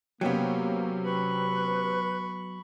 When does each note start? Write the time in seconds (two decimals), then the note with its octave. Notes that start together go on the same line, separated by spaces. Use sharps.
0.21 C3 F#3 A#3 B3 C#4 G5
1.05 B4 B5 C#6